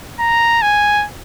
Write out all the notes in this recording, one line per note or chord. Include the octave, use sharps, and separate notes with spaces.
A#5
G#5